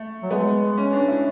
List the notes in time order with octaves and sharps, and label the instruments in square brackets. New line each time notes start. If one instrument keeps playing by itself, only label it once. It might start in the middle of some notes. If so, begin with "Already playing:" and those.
Already playing: [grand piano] A3
[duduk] F#3
[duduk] G#3 [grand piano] B3
[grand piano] C#4
D4
E4